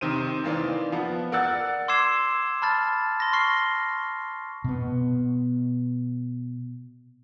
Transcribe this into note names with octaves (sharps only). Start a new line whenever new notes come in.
C3 D#3 C5 D#7
D#3 E3 A#3 C5 D5
F3 B3
A#4 D5 F#5 E6 F#6 A6
C6 D6 E6 G#6 C7 E7
A5 B5 F6 A6
C6 A#6
C#6 F6 C7 G7
B2 B3